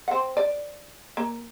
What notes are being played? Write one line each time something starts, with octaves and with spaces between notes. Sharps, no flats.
C4 F#5
D5
A#3